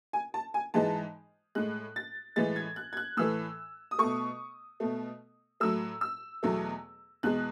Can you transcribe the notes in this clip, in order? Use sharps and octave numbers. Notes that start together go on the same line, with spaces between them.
G#5
A5
G#5
G#2 E3 G#3 A5
A2 G#3 F#6
A6
A2 E3 G#3 A6
G#6
F#6
G#6
F#6
A2 E3 A3 E6
D#6
B2 A3 C#6
B2 A3
A2 F#3 A3 E6
E6
E2 B2 F#3 A3
E2 B2 G#3 F#6